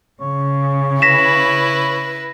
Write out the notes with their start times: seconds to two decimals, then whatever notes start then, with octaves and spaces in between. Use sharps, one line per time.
0.21 C#3 C#5
1.02 E4 B4 A#6 B6 E7